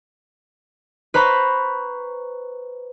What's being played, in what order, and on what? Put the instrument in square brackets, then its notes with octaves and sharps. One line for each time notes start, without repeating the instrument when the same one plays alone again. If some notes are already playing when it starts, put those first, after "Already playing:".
[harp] B4 C5 A#5 B5 C#6